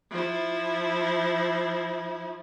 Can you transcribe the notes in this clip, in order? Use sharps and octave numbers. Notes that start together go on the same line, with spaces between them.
F3 E4